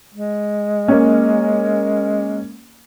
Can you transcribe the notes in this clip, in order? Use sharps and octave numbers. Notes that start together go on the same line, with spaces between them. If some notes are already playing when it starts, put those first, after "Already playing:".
G#3
A#3 C#4